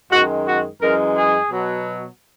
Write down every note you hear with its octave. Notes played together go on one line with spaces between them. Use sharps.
F#2 D#3 G#3 F#4
F#4
F#2 E3 G#3 A#4
G#4
B2 F#3